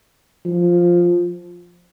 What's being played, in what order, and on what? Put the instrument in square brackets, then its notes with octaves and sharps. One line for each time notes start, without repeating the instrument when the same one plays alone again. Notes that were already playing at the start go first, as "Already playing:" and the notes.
[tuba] F3